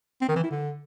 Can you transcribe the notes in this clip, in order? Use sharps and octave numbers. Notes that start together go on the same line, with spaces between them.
C4
D#3
E3
E4
D3